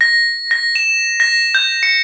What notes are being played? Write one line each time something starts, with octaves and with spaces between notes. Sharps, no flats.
A#6
A#6
E7
A#6
G6
C#7